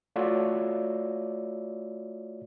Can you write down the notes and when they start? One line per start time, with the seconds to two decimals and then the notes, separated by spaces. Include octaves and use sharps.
0.16 A3 F4 F#4 C#5 D5 E5